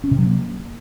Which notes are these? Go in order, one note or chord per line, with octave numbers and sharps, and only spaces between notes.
C#4
C3
F#3
A#3